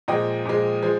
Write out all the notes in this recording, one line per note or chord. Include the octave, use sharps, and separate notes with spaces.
A#2 F3 G#3 D#5 G5
A#2 F3 G#3
F3 G#3